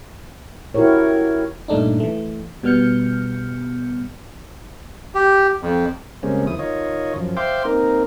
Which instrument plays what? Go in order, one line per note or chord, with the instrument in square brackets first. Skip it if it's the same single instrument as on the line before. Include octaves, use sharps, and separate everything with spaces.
[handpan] E4 F#4 G4 A#4 C#5
[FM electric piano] G2 A#2 A3 D4 D#4
E3 A3
B2 G3 B3 F6 G6 C#7
[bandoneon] G4
F2
[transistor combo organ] C#3 G3 G#3 A#3 C4 C#4
D#2 F3 E4 D#6
D#3 F4 C#5 D#5
F#2 F3
C5 E5 F5 G5 C6 D6
A#3 C4 D#4 A#4